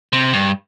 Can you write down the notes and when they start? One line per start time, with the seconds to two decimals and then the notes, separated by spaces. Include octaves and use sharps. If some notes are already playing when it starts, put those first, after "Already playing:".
0.13 C3
0.33 G2